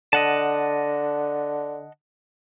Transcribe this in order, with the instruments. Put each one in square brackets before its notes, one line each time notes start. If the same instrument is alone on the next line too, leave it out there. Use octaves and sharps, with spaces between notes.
[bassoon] D3 [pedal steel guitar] D#5 F#5 A5